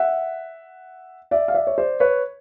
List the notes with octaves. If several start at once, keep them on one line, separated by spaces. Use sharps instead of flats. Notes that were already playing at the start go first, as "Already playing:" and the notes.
Already playing: E5 F#5
D5 E5
F5
D5 E5
C#5
C5 D5
B4 C#5